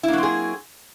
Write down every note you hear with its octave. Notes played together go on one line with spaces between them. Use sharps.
F#3 A#3 C4 E4 G#4